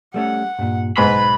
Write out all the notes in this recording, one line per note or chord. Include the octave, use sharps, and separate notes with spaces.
G3 A3 C#4 F#5
G2 A#2
B1 G#2 B4 B5